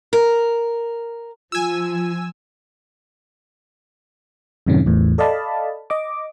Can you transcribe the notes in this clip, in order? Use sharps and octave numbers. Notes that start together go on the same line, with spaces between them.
A#4
F3 F4 G#5 E6
F#2 A2 C3 D#3 C#4
E2 A2
A4 D5 D#5 F5 A5 B5
D#5 D6